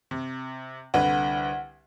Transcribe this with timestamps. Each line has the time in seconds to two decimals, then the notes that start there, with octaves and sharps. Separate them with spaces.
0.11 C3
0.94 C2 D3 B4 F#5